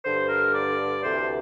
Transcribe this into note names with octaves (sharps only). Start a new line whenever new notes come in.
G2 D3 C5
A#4
D5
D2 C3 E3 C5